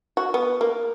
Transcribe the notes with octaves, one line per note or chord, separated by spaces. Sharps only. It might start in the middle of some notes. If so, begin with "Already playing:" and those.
F#4
B3
A#3